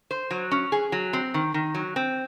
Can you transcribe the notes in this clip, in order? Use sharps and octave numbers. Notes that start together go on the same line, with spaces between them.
C5
F#3
C#4
G#4
F#3
C4
D#3
D#3
F#3
C4